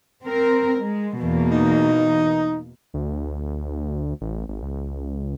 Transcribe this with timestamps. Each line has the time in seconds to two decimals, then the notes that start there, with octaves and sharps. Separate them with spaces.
0.24 C4 A#4
0.79 G#3
1.20 E2 B2 A#3
1.51 D#4
2.94 D2
4.21 A1
4.48 G#1
4.62 C#2